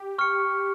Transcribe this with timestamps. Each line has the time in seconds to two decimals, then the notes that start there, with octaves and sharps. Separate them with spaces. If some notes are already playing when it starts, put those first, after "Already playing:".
Already playing: G4
0.18 C#6 F6 C#7